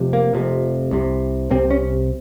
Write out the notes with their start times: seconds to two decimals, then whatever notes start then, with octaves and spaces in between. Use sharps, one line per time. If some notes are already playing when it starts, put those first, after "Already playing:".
Already playing: F1 F2 C3
0.13 A#3
0.33 F1 F2 C3
0.91 C2 C3
1.50 C2 C3 C4
1.70 C#4